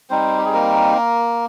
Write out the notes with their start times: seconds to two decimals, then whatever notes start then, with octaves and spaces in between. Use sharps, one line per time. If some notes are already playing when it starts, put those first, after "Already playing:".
0.10 G3 C4 D#4 C5
0.38 G4
0.46 G#4
0.54 A#3 A#4